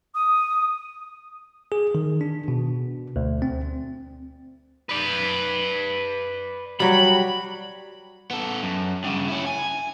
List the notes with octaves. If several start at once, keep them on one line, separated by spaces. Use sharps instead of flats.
D#6
G#4
D#3
D4
B2
D2
C4
B4 D5
F#3 G3 B5
B3 A4
F#2
G2 C#3
C#4 E4
G#5